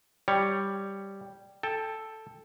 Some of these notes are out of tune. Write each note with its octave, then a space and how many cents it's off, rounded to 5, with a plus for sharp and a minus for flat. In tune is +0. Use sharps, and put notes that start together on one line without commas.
G3 +0 C#5 +5
A4 +0 G5 +25